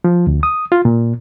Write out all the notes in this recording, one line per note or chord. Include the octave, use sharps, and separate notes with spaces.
F3
D2
D#6
F4
A#2